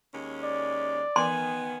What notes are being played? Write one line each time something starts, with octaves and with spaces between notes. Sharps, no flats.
D#2 G#3 C#4
D5
D#3 B3 G#5 C6